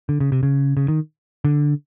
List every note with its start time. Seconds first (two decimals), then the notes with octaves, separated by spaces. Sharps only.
0.09 D3
0.20 C#3
0.32 C3
0.43 C#3
0.77 C#3
0.88 D#3
1.45 D3